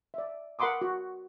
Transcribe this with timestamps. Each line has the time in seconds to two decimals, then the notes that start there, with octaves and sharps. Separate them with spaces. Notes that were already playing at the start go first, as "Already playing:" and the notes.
0.14 D5 E5
0.59 A#4 F#5 B5 C6 D6 D#6
0.81 F#4